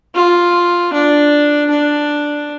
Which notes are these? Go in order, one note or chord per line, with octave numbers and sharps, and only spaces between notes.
F4
D4
D4